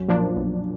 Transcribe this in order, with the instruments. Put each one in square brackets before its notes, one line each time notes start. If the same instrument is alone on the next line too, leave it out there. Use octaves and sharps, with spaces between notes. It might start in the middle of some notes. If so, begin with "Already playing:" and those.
Already playing: [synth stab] B1 [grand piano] F#2 F#3
[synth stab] A#2 F3 A#3 D4
B1